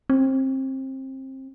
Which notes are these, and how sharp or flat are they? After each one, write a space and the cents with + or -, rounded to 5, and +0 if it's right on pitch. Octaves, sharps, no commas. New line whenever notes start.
C4 +25